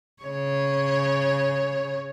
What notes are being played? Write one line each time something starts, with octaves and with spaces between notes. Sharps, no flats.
C#3 C#5